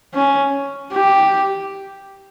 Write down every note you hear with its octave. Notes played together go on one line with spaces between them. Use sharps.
C#4
G4